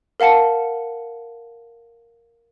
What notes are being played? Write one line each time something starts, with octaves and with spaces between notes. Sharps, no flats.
A#4 F5 F#5 A5 C#7